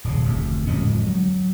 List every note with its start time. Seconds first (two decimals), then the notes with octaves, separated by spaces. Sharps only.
0.04 D#1 A2 C#3
0.25 F1 D2
0.67 D1 F2 G#3 C#4
1.07 F#3